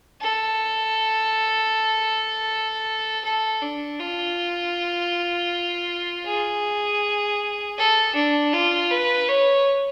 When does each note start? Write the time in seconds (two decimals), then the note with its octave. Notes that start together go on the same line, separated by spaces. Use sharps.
0.21 A4
3.24 A4
3.62 D4
3.99 F4
6.26 G#4
7.77 A4
8.15 D4
8.53 F4
8.91 B4
9.29 C#5